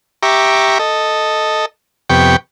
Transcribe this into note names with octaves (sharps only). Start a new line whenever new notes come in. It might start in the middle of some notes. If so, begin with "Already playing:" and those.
G4 E5 A#5 C#6 D6
A4 D#5
F2 C3 B3 G4 G5 C#6